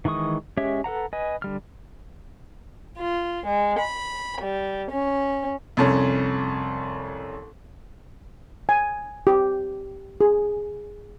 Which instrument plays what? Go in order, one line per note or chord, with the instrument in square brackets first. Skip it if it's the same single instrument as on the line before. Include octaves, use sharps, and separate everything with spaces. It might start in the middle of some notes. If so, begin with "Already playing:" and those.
[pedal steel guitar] D#3 E3 G#3 C#6 D#6
G#3 C#4 G4 C#5 E5
A4 B4 F#5 A#5
B4 D#5 G#5
D3 G3 F6
[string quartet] F4
G#3
B5
G3
C#4
[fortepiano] C2 F2 C#4
[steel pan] G#5
G4
G#4